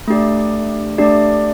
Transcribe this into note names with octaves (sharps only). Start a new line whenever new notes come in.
A3 D4 G4 D5
A3 D4 G4 D5